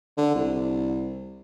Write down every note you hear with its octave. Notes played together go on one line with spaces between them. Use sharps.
D3
C2